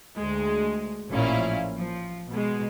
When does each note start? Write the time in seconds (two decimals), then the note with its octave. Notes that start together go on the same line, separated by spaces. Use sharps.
0.19 D2 G#3
1.11 A1 A#2 F3 C#4 E4 F5
1.77 F3
2.30 B2 G#3